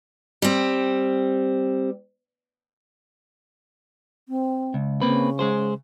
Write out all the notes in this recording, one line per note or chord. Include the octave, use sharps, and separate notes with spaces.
G3 C4
C4
C#2
C#3 A#3 C4 B4
G#3 G#4 C5